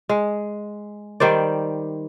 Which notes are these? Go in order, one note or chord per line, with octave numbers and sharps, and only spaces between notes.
G#3
D#3 G3 C5 D5